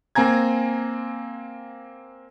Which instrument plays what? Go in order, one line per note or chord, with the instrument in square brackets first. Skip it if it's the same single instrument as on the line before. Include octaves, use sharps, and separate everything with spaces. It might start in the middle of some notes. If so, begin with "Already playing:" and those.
[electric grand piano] A#3 C4 G#5 A#5 G#6